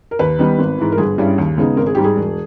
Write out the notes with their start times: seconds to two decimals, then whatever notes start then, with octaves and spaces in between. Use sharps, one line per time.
0.11 A#4
0.19 D#2 B4
0.39 D#3 G3 B3 D#4
0.59 G#1
0.78 G#2 E3
0.92 A#4
0.98 G1 G#4
1.18 G2 G3 C#4 E4
1.38 D#2
1.58 C#3 G#3 B3 D#4
1.77 G#1 A#4
1.86 G#4
1.95 G#2 G3 G4
2.04 G#4
2.16 E1